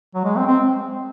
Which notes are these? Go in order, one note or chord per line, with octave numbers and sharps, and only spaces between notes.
F#3
G#3
C4
C4